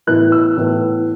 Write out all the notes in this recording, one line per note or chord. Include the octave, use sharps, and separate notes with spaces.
A2 E3 B3 F#6
E6
A2 E3 B3